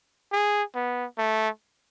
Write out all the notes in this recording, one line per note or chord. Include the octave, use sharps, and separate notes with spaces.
G#4
B3
A3